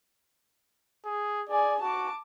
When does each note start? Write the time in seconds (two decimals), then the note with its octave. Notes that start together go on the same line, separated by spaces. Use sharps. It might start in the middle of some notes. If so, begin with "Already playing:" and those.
1.05 G#4
1.49 G#4 D5 G#5
1.81 F#4 A5 D6